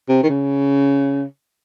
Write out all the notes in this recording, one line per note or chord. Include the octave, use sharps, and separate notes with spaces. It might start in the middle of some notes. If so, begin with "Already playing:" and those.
C3
D#3
C#3